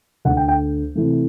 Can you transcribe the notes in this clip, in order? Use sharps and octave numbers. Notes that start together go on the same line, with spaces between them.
D2 D3 A3 D4 F#5
G5
G5
C3 E3 A3